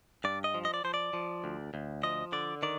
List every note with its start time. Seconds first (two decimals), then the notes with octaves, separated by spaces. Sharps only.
0.24 G2 D5
0.44 D#5
0.54 F3
0.65 D#5
0.74 D5
0.84 F3 C5
0.94 D5
1.13 F3
1.44 D2
1.74 D2
2.03 F3 D#5
2.32 D3 D5
2.63 D#3 D5